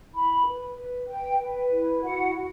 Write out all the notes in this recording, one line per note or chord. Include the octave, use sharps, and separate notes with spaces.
E4 B5
B4
B4
B4 G5
B4
E4
F#4 F#5
F#4